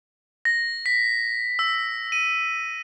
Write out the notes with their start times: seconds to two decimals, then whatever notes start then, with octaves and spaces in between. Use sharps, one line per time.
0.45 A#6
0.86 B6
1.59 E6
2.12 D#7